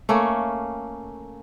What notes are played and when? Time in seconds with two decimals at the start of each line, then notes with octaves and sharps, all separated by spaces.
0.09 A3 A#3 C#4